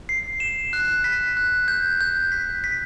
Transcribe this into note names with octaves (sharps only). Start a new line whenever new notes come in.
C7
E7
F#6
B6
F#6
G6
G6
B6
B6